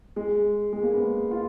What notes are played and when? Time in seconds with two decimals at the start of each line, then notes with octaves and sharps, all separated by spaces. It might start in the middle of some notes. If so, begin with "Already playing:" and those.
0.16 G#3
0.73 G#3
0.83 A#3
0.94 B3
1.31 F4